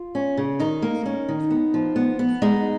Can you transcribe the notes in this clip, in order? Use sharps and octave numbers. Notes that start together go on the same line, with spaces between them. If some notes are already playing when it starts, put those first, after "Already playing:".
Already playing: F4
C#4
C#3
D#3 D#4
A#3
C#4
D#3
B3
F3
B3
B3
G#3 D#4